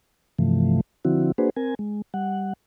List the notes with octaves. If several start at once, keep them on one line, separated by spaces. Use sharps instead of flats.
G2 C3 E3 F3 A3
D3 F3 C4 E4 F#4
A#3 D4 F#4 G#4 B4 C5
C4 A#4 G#5
G#3
G3 F#5